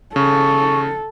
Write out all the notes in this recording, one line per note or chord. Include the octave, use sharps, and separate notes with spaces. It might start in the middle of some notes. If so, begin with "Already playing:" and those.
C#3 A4 C#6